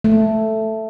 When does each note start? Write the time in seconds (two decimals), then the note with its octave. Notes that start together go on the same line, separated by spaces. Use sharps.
0.04 A3